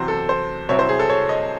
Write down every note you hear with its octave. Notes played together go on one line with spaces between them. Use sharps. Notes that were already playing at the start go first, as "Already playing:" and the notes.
Already playing: E2 C3 F#3 C4 C5
A4
C5
C2 C3 F#3 C4 E4 C#5
C5
G#4
A4
C#5
D#5